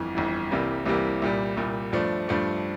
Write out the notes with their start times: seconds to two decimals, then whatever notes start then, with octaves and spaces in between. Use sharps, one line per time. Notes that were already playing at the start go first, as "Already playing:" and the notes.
Already playing: G1 F2 E3
0.15 G1 F2 E3
0.51 C2 C3 E3 G3 A#3
0.86 C2 C3 E3 G3 A#3
1.22 C2 A#2 G3
1.57 C2 A#2 G3
1.93 G2 F3 A3 D4
2.28 G2 F3 A3 D4